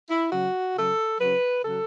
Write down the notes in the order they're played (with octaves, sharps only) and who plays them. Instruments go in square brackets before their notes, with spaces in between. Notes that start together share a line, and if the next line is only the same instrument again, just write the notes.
[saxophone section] E4
C#3 F#3 F#4
C#3 F#3 A4
C#3 F#3 B4
C#3 F#3 A4